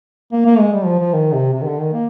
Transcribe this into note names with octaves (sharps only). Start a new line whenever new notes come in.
A#3
A#3
G#3
G3
F3
F3
D#3
C3
C3
D#3
D3
D#3
A#3